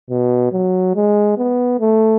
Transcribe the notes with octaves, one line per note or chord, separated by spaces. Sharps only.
B2
F#3
G#3
B3
A3